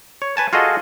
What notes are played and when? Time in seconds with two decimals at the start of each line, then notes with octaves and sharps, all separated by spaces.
0.22 C#5
0.37 B4 G#5 A5
0.53 F4 F#4 G#4 A4 D#5